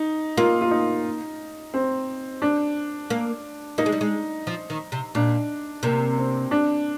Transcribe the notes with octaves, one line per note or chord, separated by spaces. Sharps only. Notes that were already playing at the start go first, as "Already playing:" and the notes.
Already playing: D#4
A#3 F4
F4
D#4
C4
D4
A#3
A#3 D#4
G#3
G3
G#3
F3
D#3
C3
A#2 D4
C3 A#3
C4
D4